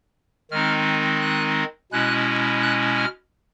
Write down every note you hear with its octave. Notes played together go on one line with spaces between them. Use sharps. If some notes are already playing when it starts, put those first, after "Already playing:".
D#3 G#3 C4 D#4 F6
F#6
B2 G#3 C#4 E4 F#6
F#6
F6